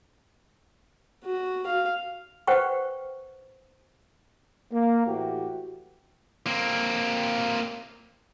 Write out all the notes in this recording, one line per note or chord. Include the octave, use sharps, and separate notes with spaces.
F#4
F5
B4 C5 F#5 G5 C#6
A#3
A2 E3 F#4 G4
A#3 C4